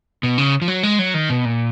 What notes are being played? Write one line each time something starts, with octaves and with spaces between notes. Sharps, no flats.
B2
C#3
F3
F#3
G#3
F#3
D#3
B2
A#2